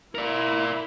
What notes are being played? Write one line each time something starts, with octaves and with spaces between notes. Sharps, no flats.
E4 A#4 D5